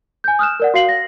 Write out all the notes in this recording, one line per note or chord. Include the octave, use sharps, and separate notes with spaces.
G#5 G6
D#6 F6 F#6 E7
A#4 D5 F#5
F#4 F5 C7 F#7
A#6